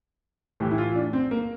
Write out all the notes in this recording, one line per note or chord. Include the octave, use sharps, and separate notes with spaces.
A2 E3 G4
E4
F4
D4
C4
A#3